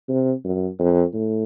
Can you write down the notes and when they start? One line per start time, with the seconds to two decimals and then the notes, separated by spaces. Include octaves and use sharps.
0.09 C3
0.45 F#2
0.79 F2
1.14 A2